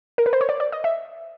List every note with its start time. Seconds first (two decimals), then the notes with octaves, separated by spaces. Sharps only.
0.18 A#4
0.26 B4
0.33 C5
0.41 C#5
0.49 D5
0.60 D5
0.72 D#5
0.84 E5